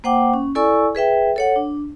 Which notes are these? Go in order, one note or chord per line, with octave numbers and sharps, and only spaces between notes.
A#3 C5 F#5 G5 D6
C#4
E4 A4 D5 G#5 C#6 E6
G#4 B4 E5 G5
A4 C#5 F#5
D4